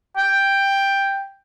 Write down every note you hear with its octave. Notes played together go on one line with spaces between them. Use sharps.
G5